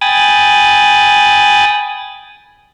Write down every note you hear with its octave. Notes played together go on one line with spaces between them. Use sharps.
G5 G#5 B5 D#6 A6